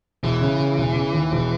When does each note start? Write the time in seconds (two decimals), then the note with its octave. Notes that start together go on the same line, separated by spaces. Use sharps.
0.23 E1 E3
0.41 C#3
0.59 C#3
0.78 E1
0.95 C#3
1.14 D#2
1.32 E1